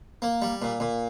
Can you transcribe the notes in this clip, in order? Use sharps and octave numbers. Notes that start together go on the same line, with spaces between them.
A#3
G3
A#2
A#2